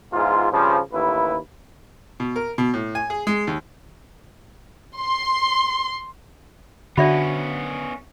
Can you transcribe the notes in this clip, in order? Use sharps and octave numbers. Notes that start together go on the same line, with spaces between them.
E2 G#2 F4
G2 C#3 F3
A1 D#2 E4 B4
B2
A#4
B2
A2
G#5
G#4
G#3
D#2
C6
D3 B3 C#4 F#4 D5 E5 B5